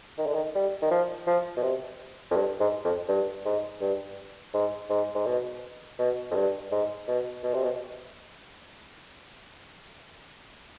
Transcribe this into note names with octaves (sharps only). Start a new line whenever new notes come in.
D#3
D3
D#3
G3
D#3
F3
F3
B2
C3
F2
G2
G#2
F2
G2
G#2
G2
G#2
G#2
G#2
B2
B2
F2
G2
G#2
B2
B2
C3
B2